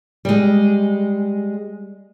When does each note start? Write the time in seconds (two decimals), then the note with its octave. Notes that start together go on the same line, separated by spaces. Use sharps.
0.25 G3 G#3